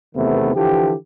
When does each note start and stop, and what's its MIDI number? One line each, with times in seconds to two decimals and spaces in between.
0.15 0.54 40
0.15 0.54 48
0.15 0.54 51
0.15 0.54 57
0.15 0.54 59
0.55 0.94 50
0.55 0.94 52
0.55 0.94 53
0.55 0.94 67